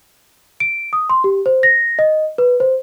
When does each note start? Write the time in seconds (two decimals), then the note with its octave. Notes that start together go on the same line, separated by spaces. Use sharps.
0.60 D7
0.93 D#6
1.10 C6
1.24 G4
1.46 C5
1.63 A#6
1.99 D#5
2.38 B4
2.60 C5